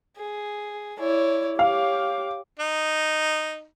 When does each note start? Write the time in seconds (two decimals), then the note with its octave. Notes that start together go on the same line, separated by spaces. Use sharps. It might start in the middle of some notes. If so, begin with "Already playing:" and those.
0.17 G#4
1.00 E4 C#5 D5
1.59 G4 C#5 F5 D6
2.60 D#4